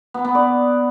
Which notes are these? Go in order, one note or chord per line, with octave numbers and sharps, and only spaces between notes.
B3
B3
D5